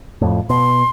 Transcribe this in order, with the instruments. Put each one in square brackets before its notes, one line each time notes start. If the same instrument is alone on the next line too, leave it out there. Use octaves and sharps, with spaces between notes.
[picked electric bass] F2 A2
[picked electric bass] B2 [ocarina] C6